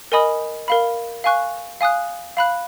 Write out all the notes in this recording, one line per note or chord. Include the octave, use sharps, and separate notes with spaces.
A#4 D#5 G#5 B5 D#6
A#4 F5 B5
F5 G#5 C#6 F#6
F5 G#5 D#6 F#6
F5 B5 F#6